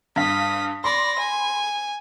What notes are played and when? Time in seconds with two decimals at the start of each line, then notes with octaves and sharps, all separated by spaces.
0.16 G2 F5 D#6 B6
0.84 D5 B5 C6 A#6
1.19 G#5